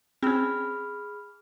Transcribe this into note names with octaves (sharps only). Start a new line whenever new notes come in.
C4 C#4 G#4 B5 F6